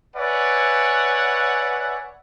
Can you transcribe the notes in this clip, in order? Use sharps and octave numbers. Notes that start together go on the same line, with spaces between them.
B4 C#5 D5 E5 F#5 G#5